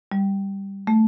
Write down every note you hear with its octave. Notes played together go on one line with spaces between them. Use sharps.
G3
A3